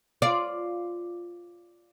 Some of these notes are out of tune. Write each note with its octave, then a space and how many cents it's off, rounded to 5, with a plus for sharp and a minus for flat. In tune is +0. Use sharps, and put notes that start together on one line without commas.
F4 +0 D5 +0